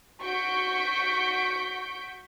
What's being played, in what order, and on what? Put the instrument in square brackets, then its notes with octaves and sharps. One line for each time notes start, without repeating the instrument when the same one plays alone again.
[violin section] F#4 C#6 G6 B6 D7